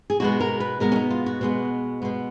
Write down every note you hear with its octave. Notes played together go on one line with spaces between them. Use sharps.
G#4
B2 G#3 B3 F#4
A#4
B4
B2 G#3 B3 A#4
C#4
D#4
F4
F#4
B2 G#3 B3
B2 G#3 B3